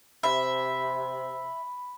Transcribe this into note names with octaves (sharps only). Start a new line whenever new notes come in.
C3 E5 B5